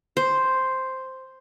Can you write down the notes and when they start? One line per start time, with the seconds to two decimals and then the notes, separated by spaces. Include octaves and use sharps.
0.17 C5